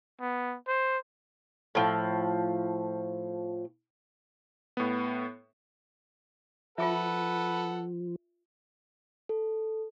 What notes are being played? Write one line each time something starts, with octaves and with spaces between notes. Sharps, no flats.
B3
C5
A2 F3
A2 B3
F3 F4 G#4 A4 B4 E5 F#5
A4